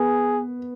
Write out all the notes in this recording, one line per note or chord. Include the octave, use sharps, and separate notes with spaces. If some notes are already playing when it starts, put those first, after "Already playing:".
Already playing: B3 G#4